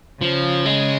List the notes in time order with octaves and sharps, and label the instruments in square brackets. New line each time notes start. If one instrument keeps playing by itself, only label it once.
[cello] C#3 [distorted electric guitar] F3
[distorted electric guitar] G#3